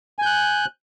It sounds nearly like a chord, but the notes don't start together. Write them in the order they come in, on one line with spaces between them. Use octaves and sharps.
G#5 G6 F#6